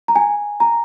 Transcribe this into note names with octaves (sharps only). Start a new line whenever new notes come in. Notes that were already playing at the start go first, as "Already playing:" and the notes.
A#5
G#5
A#5